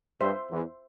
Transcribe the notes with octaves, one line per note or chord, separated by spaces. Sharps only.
G2 C5 E5 C6
E2